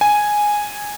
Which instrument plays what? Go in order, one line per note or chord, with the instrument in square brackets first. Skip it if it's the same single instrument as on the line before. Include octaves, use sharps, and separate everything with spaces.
[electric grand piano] G#5